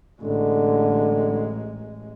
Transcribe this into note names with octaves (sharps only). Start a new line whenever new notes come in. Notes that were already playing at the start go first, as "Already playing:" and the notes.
A1 D3 G#3